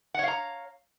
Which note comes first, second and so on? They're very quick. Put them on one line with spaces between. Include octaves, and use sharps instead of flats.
F#5 C#5 F5 A#5